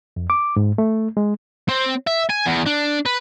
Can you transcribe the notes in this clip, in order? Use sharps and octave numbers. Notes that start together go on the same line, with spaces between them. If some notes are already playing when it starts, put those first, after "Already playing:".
F2
D6
G#2
A3
G#3
C4
E5
G#5
E2
D4
B4